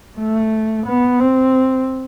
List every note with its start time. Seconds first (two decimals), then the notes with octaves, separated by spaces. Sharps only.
0.18 A3
0.86 B3
1.20 C4